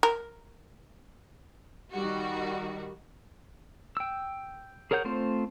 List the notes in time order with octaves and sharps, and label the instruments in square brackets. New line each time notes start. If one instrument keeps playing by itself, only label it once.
[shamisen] A#4
[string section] D#3 G3 F#4
[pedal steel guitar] G5 E6
G#4 A#4 C#5 F#5 G6
A3 C4 F4 C5